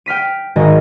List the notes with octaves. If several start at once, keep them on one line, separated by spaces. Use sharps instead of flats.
G5 F6 B6 D#7
G#1 D#3 F#4 D#5 G#5